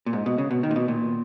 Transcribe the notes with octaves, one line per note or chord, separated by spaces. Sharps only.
A#2
G#2
B2
C#3
B2
D#3
A#2
B2
A#2